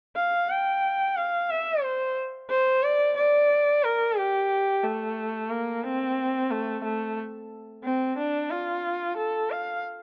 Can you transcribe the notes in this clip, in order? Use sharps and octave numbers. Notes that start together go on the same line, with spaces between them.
F5
G5
F5
E5
C5
C5
D5
D5
A#4
G4
A3
A#3
C4
A3
A3
C4
D4
F4
A4
F5